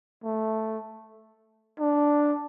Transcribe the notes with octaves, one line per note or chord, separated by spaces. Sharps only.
A3
D4